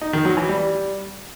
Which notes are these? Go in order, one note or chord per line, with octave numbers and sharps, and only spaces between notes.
D#4
D#3
F#3
E3
G3